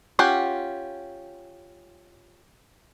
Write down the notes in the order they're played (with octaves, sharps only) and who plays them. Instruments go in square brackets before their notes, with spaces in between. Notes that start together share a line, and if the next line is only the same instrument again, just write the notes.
[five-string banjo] C#4 F4 G4 F#5 G#5